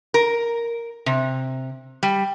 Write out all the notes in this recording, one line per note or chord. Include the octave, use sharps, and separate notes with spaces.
A#4
C3
G3